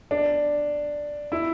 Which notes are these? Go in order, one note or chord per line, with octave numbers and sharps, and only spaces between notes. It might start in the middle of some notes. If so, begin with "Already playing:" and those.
D4
E4